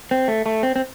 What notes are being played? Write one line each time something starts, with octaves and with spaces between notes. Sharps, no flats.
C4
A3
A3
C4
C4